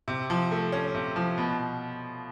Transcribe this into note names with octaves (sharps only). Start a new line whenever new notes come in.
C3
F3
A3
C#4
C3
F3
B2